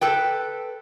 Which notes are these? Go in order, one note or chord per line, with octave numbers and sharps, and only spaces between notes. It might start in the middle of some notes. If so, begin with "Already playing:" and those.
A4 B4 G5